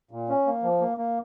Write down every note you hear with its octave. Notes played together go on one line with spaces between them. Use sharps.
A#2
C#4
A#3
F3
A#3
A#3